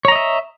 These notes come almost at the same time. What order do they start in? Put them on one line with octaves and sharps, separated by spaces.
C#5 A#5 D#5 E5